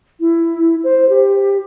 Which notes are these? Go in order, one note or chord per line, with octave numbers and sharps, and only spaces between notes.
E4
C5
G4